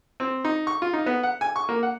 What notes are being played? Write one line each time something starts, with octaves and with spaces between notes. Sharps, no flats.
C4
D#4
C#6
F4
D#4
B3
F#5
G#5
C#6
A#3
F#5